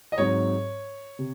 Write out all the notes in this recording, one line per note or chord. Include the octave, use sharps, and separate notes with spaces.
D#5
G#2 F#3 C4 C#5
C3